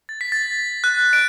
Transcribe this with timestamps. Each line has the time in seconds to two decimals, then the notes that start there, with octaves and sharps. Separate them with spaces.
0.09 A6
0.21 B6
0.32 A6
0.84 F#6
1.13 D7